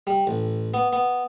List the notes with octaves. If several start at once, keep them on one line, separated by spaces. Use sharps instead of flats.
G3
A1
B3
B3